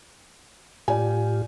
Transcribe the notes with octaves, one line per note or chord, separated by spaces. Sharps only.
A2 F4 G4 D5 G#5